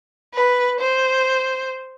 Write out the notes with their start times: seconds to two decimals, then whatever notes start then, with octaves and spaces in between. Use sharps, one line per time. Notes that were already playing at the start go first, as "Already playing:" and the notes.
0.34 B4
0.80 C5